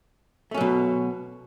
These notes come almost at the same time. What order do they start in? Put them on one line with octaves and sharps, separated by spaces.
A3 C#4 F#3 B2